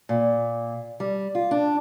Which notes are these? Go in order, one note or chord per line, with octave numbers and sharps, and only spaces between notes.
A#2
G3
F4
D4